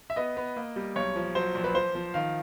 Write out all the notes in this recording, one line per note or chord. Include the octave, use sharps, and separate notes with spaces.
E5
B3 D#5
B3
A#3
G3
B1 C#5
F3
F#3 C5
A#1
B4
F3 C5
F3
D#3 F5